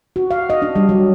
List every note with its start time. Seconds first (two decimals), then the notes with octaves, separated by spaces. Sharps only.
0.16 F#4
0.31 F5
0.50 D#5
0.62 D4
0.76 G3
0.89 F#3